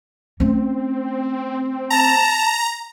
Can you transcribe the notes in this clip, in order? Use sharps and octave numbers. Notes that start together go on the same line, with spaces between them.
A3 C4 C#4
A5 A#5